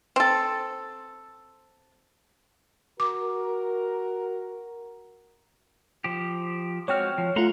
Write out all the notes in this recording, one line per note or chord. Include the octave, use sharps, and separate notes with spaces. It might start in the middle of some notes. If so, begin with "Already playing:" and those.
C4 A4
F#4 A#4 D6
F3 G4
G#3 C4 F#4 C#5 G5 F6
F3
A3 F4 F#5 A#5 C6